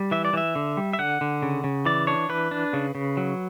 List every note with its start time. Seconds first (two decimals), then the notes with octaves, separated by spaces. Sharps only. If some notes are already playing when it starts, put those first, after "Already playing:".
Already playing: G3
0.11 E3 E5
0.25 D5
0.33 E3 E5
0.55 D3
0.77 G3
0.93 E5
0.99 D3 F#5
1.21 D3
1.42 C#3
1.64 C#3
1.85 E3 D5
2.07 D4 C#5
2.29 E3 B4
2.51 D4
2.73 C#3
2.95 C#3
3.17 F#3